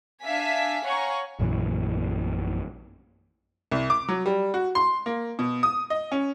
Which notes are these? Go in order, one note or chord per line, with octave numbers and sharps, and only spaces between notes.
D4 E5 F5 G#5 B6
C#5 F5 F#5 G#5 A#5 C#6
A#1 F#2 A#2 E3
C2
D6
F#3
G3
F#4
C6
A#3
B2
D#6
D#5
C#4